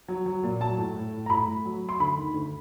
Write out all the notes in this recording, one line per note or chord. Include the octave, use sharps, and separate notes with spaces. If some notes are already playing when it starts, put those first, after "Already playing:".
F#3
F#3
A#2
F#3 A5
A2
A2
A2
A#5
A2 B5
A3
F#3
F#3
C6
D2 B5
D#3
D2